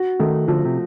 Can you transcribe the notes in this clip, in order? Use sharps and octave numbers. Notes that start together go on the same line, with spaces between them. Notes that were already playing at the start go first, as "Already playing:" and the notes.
Already playing: F#4
D#3 A3
D3 F3
C3